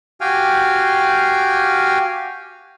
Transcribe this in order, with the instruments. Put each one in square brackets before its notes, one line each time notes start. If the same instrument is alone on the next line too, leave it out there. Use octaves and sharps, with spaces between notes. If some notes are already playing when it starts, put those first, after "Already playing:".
[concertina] F#4 G4 F5 G5 G#5 F6